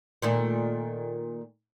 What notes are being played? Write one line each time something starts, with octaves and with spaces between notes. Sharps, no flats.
A#2 D#3 A3